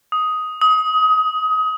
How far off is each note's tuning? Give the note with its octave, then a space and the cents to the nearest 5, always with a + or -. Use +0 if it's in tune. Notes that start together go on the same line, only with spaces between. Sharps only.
D#6 +10
D#6 +25